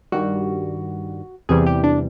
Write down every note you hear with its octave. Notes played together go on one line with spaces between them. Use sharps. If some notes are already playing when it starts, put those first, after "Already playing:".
G2 D#3 G3 F#4
E2 C3 E3 G3 G#4
G4
D4